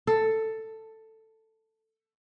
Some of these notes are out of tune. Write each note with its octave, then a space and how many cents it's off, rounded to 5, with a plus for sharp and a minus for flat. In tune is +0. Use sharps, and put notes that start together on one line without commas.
A4 +10